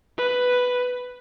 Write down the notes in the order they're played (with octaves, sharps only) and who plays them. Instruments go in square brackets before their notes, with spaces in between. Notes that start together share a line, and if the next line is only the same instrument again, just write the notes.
[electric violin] B4